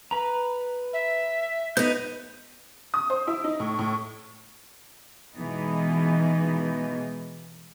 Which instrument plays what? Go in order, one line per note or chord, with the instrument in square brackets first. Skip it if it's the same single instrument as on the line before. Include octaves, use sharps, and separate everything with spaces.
[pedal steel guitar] B4 A#5
[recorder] E5
[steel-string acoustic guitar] B3 D#4 [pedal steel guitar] B4 G6
[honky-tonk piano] D#6
C5
E4
D#4
A2
A2
[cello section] B2 E3 G#3 B3 D#4